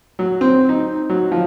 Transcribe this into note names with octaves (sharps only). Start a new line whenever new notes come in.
F#3
C4
D#4
F#3
F3